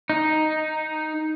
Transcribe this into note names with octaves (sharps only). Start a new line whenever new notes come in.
D#4